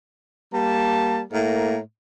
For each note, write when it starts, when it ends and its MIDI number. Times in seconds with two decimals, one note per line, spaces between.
0.54 1.22 55
0.54 1.22 58
0.54 1.22 81
1.32 1.77 45
1.32 1.77 58
1.32 1.77 70